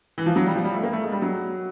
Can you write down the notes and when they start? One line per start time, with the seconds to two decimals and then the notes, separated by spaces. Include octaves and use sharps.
0.18 E3
0.26 F3
0.36 F#3
0.46 G3
0.56 F3
0.64 G3
0.74 A3
0.83 A#3
0.93 A3
1.04 G#3
1.12 G3
1.22 F#3